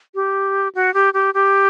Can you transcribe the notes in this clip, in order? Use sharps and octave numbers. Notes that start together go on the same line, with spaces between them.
G4
F#4
G4
G4
G4